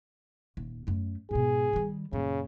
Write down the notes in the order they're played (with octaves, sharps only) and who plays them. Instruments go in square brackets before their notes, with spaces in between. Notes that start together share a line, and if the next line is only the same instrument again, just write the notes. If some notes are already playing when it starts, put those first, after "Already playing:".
[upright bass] D#1
F#2 A3
[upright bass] G#2 B2 [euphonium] G#4
[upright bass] D#3 G3
[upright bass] F#2 A#2 [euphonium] C#3